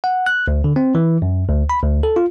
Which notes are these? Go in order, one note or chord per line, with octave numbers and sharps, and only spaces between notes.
F#5
F#6
D2
D3
C4
E3
F#2
D2
B5
D2
A4
F4